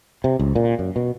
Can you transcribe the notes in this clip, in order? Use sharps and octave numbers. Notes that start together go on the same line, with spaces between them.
C3
C#2
A#2
F#2
B2